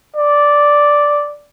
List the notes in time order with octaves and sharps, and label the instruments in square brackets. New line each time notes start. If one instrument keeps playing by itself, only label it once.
[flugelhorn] D5